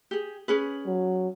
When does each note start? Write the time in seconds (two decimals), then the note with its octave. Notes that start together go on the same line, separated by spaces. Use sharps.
0.11 G4 G#4
0.48 C#4 G#4 B4
0.86 F#3